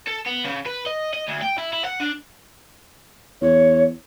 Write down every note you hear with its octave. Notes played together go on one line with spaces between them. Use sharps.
A4
B3
C#3
B4
D#5
D#5
D2
G5
E4
E4
F#5
D4
E2 C#5